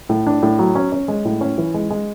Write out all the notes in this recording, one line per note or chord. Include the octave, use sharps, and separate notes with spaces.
A2
D4
A2
F#3
C#4
C#4
G#3
A2
C#4
E3
G#3
G#3